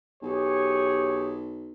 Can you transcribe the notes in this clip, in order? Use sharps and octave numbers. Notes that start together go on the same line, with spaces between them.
B1 G4 G#4 C#5